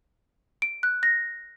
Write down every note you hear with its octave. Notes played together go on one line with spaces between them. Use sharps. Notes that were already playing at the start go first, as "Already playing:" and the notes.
D7
F#6
A#6